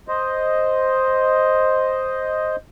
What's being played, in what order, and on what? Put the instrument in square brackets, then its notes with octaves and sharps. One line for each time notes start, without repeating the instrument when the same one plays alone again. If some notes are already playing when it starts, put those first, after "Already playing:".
[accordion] C5 D#5